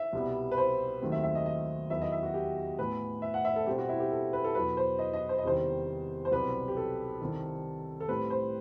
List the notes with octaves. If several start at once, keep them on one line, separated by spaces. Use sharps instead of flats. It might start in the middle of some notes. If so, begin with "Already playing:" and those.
Already playing: E5
C2 B2 G3 B3
B4
C5
D#2 D#3 F#3 A3 C4
E5
E5
D#5
D#5
E2 D#3 F#3 B3 E5
D#5
E5
F#4
G4
A2 E3 B3 B4
E5
F#5
E5
A4
B2 G3 C4 G4
F#4
E4
G4
A4
B4
A4
E2 B2 F#3 B4
C5
D#5
D#5
C5
D#5
E2 C3 D#3 G3 C5
C5
C2 B2 F#3 C4 B4
G4
A4
C2 C3 D#3
A4
A2 G3 C4 B4
C5